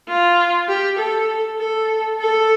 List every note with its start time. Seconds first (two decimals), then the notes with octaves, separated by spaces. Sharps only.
0.08 F4
0.68 G4
0.98 A4
1.59 A4
2.19 A4